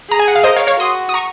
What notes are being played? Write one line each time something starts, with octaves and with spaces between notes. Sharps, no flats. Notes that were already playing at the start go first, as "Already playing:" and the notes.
G#4 A#5
G#5
F#5
F5
A#4 C5 D#5
C#5 F5
C#5 F5
F#4 C6 D#6
D#6
A#5 C#6